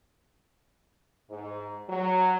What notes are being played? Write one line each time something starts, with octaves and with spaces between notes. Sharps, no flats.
G#2
F#3